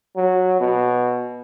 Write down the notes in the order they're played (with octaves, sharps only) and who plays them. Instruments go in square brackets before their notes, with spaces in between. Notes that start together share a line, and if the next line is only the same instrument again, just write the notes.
[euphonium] F#3
B2